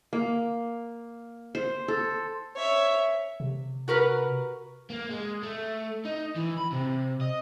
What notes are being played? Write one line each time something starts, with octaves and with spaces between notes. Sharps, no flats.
A#3
C5
A4
C#5 E5
C3
F#4 A#4 B4
A#3
G#3
A3
D#4
E3
B5
C3
D#5